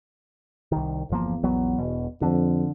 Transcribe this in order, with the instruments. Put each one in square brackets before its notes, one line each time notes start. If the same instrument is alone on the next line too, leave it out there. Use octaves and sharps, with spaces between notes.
[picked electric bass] C2 D#3
[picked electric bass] G1 F3 A#3 [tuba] E2
[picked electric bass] A#1 F#3 B3
E1 B2
[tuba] F2 [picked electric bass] D3